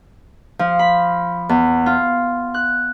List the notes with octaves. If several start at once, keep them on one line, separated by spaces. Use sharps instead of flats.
F3
B5
E2
F4
F#6